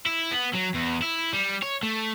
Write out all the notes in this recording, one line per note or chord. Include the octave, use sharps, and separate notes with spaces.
E4
B3
F#3
E2
E4
G3
C#5
A3